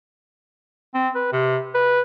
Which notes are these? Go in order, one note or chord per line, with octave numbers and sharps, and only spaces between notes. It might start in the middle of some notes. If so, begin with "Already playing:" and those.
C4
B4
C3
B4